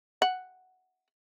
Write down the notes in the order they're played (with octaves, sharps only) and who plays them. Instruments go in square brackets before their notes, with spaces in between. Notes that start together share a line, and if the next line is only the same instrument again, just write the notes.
[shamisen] F#5